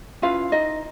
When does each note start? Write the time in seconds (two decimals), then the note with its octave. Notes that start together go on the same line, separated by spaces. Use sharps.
0.22 C#4 E4 F4 B4 F5
0.52 D#4 D#5